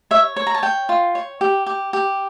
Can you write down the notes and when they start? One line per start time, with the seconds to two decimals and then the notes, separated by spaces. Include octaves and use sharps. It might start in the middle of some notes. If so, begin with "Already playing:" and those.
0.11 C#5 E5
0.36 C#5
0.47 A#5
0.55 A5
0.62 C#5 G5
0.89 F4
1.15 C#5
1.41 G4
1.66 G4
1.93 G4